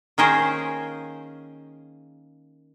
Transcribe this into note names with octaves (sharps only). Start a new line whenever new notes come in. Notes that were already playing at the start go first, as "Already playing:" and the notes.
D#3 A#3 C#4 G#4 A#4 C5